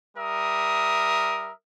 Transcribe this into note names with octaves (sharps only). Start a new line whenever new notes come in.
G3 A#4 E5 D#6